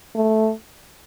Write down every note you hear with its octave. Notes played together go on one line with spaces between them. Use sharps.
A3